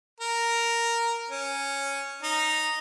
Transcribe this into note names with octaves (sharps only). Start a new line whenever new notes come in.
A#4
C#4
D#4